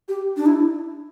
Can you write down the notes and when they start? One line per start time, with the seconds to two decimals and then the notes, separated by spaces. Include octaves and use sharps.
0.08 G4
0.37 D4
0.46 E4